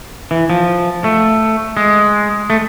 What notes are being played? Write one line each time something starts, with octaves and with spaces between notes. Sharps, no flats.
E3
F3
A3
G#3
A3